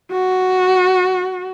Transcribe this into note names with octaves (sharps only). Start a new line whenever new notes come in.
F#4